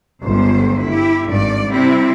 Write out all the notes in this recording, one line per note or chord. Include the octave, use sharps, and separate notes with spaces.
G1 C#2 C5
E4 G4
G#1 G2 D5
C3 G3 C4 E4